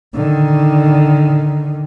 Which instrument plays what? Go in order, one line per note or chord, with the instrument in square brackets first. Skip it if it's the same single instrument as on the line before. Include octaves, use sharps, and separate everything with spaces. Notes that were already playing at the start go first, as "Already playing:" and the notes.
[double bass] D3 D#3